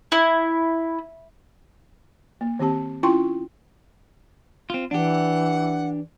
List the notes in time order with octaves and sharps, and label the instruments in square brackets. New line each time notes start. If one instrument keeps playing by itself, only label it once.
[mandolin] E4
[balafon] A#3
D#3 C4 G4 A5
C#4 E4 F4 G5 C6 C#6
[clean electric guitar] C4 F4
[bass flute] E3 [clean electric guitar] D4 G4 [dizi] F#5